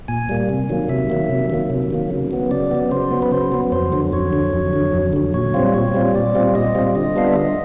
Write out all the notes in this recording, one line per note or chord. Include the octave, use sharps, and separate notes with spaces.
A#2 G#5
G3 A#3
C3
D#3 F#3 A#3
C3 E5
D#3 F#3 A#3
C3
D#3 F#3 A#3
C3
D#3 F#3 A#3
C#3
F#3 B3
C#3 D5
F#3 B3
C#3 C5
F#3 B3
B4
C#3 C5
F#3 B3
F2 C5
D3 F#3
F2 C#5
D3 F#3
F2
D3 F#3
F2
D3 F#3
A#2 C#5
G3 C4 F4
A#2 C#5
G3 C4 F4
A#2 D5
G3 C4 F4
A#2 D#5
G3 C4 F4
D3 D#5
G3 B3 D4 F4 F5
E5
D3 D#5